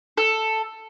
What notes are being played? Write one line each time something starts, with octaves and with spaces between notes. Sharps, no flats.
A4